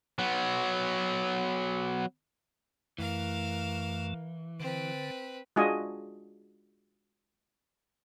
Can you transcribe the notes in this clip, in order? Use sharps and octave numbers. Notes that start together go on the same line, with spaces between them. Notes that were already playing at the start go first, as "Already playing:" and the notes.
F#3 B3
F#2 E3 A3 A#4 F5
D3 C4 B4
G#3 D4 F4 F#4 D#5 G#5